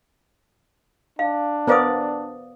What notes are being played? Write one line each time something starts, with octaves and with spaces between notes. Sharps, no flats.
D4 F5
B3 A#4 C5 D5 F5 D#6